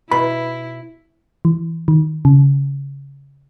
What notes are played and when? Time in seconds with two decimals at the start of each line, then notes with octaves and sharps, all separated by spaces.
0.11 B2 E4 B5
1.45 E3
1.88 D#3
2.25 C#3